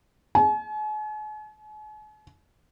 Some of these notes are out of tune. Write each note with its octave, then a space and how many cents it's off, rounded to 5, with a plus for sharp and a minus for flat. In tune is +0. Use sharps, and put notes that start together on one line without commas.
G#5 +45